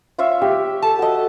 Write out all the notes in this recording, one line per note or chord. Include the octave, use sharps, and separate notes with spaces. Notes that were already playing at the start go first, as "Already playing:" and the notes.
F4 C#5 E5
G4 E5
A4 A5
F#4 A4 D#5